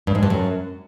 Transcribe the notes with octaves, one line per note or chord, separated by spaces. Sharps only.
G2
G#2
G2
F#2